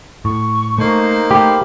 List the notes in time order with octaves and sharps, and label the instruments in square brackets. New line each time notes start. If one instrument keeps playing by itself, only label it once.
[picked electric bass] A2 [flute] C#6
[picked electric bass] A3 [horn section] A#3 D#4 C5
[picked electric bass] A3 [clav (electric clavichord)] G4 [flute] B5